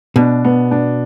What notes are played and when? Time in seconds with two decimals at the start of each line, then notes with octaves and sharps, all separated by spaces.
0.16 B2 D4
0.45 B3
0.71 D4